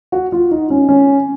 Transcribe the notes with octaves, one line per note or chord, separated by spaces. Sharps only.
F#4
F4
D#4
C#4
C#4